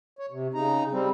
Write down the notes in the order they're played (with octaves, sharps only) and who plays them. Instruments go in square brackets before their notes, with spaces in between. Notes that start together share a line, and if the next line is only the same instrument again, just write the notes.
[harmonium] C#5
C3
C#3 D#4 A#5
G3 C4